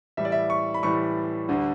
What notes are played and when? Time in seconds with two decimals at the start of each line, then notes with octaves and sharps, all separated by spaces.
0.17 A2 E3 G3 E5
0.25 D5
0.32 E5
0.50 C#6
0.74 B5
0.83 A2 E3 G3 C#6
1.48 D2 D3 G3